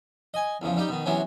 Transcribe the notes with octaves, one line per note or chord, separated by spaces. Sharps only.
D#5 G#5
E2 C#3 F3
G3 D#4 G4
B2 D#3
C3 E3 F#3 B3 C#4